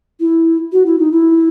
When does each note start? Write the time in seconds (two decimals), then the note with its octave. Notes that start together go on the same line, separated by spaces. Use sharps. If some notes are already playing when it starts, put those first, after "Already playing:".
0.20 E4
0.72 F#4
0.86 E4
0.99 D#4
1.12 E4